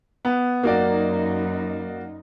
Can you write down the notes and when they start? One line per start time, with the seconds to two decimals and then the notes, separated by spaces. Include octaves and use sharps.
0.25 B3
0.63 F#2 A#3 D#4 F#4 D5